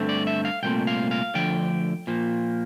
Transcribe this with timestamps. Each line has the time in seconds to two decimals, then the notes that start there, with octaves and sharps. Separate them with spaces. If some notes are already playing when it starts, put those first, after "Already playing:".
Already playing: G2 D3 A3 C4
0.09 D5
0.27 E5
0.45 F5
0.63 C2 A#2 A3 C4 G5
0.87 F5
1.11 F5
1.35 D2 D3 F3 G5
2.07 A#2 F3 A#3